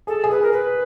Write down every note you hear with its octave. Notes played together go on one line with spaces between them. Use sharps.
G#4 A4
G#4
B4
A#4
B4